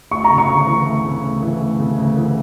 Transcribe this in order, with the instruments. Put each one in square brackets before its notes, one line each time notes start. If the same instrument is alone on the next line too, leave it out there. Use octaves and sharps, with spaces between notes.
[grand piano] A3 [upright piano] C#6
[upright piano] A#5
[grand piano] C#3
[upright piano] C#6
[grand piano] D2
E3
A3
C#3
D2
E3
A3
C#3
D2
E3